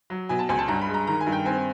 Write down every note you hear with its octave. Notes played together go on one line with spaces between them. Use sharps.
F#3
B2 G#5
A5
C#2 G#5
A5
G2 A#5
B5
G#3
A#5
D#3 A#5
G#5
G2
G5
C4 G#5